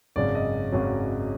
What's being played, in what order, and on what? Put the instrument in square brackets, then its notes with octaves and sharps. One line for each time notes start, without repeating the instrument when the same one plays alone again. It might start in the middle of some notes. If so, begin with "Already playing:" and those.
[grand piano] G#1 F#2 C#3 F#3 D5
D#5
G#1 F#2 C#3 F#3